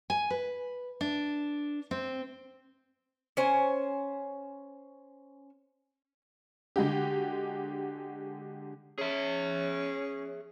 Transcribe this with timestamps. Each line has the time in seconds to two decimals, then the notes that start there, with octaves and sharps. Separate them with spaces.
0.10 G#5
0.30 B4
1.01 D4
1.91 C4
3.37 C#4 C5 G#5
6.76 D3 G#3 F#4 G4
8.98 C#4 G#4 E5